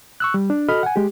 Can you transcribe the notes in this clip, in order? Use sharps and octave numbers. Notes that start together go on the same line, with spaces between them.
C#6 E6 F#6
G3
D4
F#4 A4 D#5 B5 F6
F#5 G#5
G#3 G4